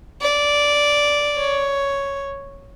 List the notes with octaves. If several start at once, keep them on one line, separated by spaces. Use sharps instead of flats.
D5
C#5